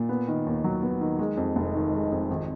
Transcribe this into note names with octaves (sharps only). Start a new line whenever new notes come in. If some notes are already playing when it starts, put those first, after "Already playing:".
Already playing: A#2
B3
D#3
D#2
F#3
B3
D#3
G#3
F2
F1
D#3
G#3
F2
G#1